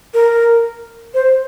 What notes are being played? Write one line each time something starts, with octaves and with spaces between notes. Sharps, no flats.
A#4
C5